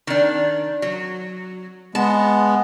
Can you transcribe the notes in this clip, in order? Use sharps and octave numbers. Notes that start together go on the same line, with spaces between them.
D#3 D4
F#3
G#3 B3 A5